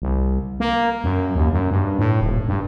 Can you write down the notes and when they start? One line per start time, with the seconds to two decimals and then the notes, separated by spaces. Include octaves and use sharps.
0.02 C2
0.60 A#3
1.04 F#2
1.36 D#2
1.52 F#2
1.71 G2
1.99 A2
2.21 D#1
2.48 G2